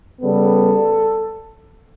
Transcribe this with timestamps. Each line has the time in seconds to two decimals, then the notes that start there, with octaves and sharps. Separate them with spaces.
0.21 C#3 G3 B3 A4